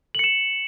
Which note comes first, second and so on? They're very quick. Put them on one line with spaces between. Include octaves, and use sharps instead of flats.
F#7 C#7 E7